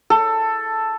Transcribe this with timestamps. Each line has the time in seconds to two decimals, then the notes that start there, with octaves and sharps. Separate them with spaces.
0.10 A4